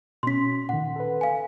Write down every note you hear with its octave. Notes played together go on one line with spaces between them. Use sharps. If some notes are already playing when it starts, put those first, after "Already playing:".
B2 C#4 C6 B6
A#2 D#3 F#5
A4 B4
F5 G#5